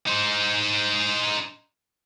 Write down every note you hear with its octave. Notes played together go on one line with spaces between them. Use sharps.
D#4 C5